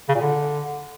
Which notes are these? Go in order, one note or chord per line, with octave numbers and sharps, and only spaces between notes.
C#3
A#2
D3